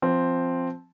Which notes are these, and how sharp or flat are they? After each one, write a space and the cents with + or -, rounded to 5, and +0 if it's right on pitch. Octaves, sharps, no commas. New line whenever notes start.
F3 +0 C4 +0